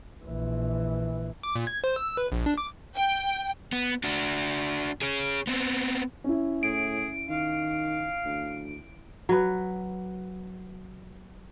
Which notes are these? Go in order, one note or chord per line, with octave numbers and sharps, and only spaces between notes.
A#1 E3
D6
A#2
G#6
C5
E6
B4
A#1
D4
D6
G5
B3
D4 F#4
G#4 C#5
B3 C4
C#4 E4
A2 G#4 D7
D#3 F5
D2
F#3 B4